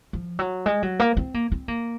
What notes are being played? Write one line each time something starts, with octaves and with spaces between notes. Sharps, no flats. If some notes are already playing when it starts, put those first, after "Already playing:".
F3
F#3
G#3
F#3
A#3
C4
A#3
C4
A#3